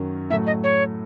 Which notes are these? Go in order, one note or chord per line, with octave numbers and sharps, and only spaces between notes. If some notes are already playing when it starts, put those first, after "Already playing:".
Already playing: F#2 D#3 F#3 C#4
A2 F#3 A3 E5
D#5
C#5